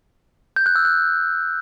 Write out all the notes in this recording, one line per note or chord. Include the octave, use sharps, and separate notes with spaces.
G6
F#6
E6
F#6